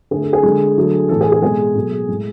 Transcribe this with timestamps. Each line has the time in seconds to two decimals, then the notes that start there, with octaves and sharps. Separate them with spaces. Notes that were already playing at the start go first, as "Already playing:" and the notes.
0.11 D3 A3 G#4
0.22 A4
0.33 G#4
0.43 D3 G#3
0.77 D3 F#3 A3
1.09 A2 E3 A3 A4
1.21 G#4
1.32 G#4
1.42 B2 G#3 G#4
1.76 B2 F#3 A3
2.09 A2 G#3